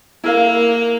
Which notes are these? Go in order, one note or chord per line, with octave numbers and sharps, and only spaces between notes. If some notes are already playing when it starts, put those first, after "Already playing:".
A#3 E4 A#4 F5